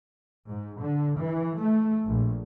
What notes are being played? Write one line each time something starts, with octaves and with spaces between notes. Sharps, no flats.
G#2
D3
E3
A3
A#1